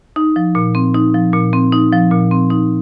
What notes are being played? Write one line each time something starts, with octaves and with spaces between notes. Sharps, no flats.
D#4
F3
A#2
C4
D#4
F3
A#2
C4
D#4
F3
A#2
C4
D#4